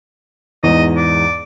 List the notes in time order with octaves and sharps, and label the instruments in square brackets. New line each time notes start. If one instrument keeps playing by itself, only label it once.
[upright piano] E2 G#2 [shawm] D#5
[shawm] D5